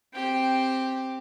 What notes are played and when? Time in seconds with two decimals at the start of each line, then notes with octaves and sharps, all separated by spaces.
0.14 C4 G4 G5